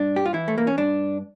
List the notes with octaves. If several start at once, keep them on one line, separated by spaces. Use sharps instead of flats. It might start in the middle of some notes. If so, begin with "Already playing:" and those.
Already playing: G2 D4
G4
F4
E3 E4
A3
A#3
C#4
G2 D4